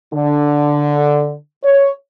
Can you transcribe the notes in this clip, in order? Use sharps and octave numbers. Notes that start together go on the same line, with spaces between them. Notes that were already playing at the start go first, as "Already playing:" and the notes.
D3
C#5